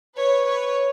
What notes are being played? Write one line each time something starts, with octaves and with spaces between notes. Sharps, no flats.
B4 C#5
B4 C#5